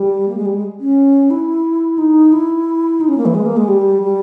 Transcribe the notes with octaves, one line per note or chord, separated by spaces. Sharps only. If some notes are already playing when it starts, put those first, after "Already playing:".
Already playing: G3
A#3
G#3
G3
G#3
C#4
E4
D#4
E4
D#4
C#4
A#3
E3
G#3
A#3
G#3
G3
G3